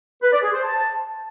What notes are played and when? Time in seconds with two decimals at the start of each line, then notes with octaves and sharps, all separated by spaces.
0.22 B4
0.32 D5
0.42 G#4
0.52 C5
0.63 A5